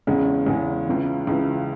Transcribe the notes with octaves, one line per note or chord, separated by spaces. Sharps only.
E2 C#3 G#3 C#4
E2 C#3 G#3 C#4
C#2 C#3 E3
C#2 C#3 E3